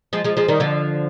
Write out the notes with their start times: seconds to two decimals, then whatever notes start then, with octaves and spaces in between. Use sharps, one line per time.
0.13 F3 G#3
0.24 F3 G#3
0.37 F3 G#3
0.48 D#3 G3
0.60 D3 F3